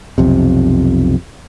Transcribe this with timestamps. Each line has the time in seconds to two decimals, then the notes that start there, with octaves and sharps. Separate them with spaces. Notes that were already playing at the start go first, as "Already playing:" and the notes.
0.18 B1 F2 C3